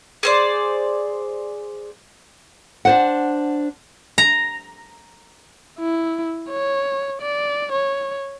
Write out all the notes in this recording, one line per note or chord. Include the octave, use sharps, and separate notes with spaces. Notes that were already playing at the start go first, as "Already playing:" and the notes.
G#4 C5 D5
D4 C5 F#5
A#5
E4
C#5
D5
C#5